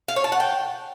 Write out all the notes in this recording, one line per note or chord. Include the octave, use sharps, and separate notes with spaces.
F5
C#5
A5
F#5
G5